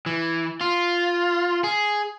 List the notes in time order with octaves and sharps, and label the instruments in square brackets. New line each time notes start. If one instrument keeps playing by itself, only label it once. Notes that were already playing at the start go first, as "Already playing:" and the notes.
[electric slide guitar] E3
F4
G#4